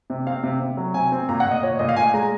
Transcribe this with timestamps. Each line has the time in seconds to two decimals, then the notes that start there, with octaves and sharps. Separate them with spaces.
0.10 C3
0.27 C4 F5
0.43 C3
0.60 C3
0.77 F#3
0.94 C3 G#5
1.12 C4
1.29 A#2 A#5
1.40 F#5
1.46 A#2
1.51 D#5
1.63 A#2 C#5
1.79 A#2 D#5
1.89 F5
1.96 A#2 G#5
2.14 G#3 A#5